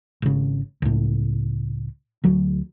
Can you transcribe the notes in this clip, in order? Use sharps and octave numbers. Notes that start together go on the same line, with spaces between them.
G#1 C#3
C#2 A2
D2 F#3